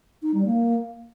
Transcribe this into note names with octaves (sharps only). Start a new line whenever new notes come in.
D#4
G3
A#3